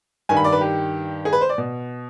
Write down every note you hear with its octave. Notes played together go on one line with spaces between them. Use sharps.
G2 D#3 G#5
B5
D5
B4
G4
G#4
B4
C5
D5
B2